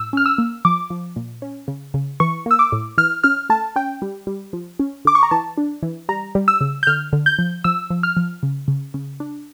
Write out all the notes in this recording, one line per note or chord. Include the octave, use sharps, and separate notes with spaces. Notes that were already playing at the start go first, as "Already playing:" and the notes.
Already playing: A2 E6
C#4 F6
E6
A#3
F3 D6
F3
A#2
C#4
C#3
C#3
E3 C#6
A#3 E6
D6
A2
E3 F6
C#4 F6
A3 A5
C#4 G5
G3
G3
F3
C#4
D3 D6
C#6
A#5
E3 A5
D4
E3
G3 A#5
G3
E6
C#3
G6
D3 F6
D3
G6
F3
F3 E6
F3
F6
F3
C#3
C#3
C#3
D4